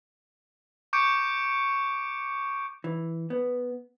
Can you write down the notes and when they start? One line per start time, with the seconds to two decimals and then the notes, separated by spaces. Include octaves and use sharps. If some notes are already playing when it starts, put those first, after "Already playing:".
0.93 C#6 D6 G6 C#7 D7
2.84 E3
3.30 B3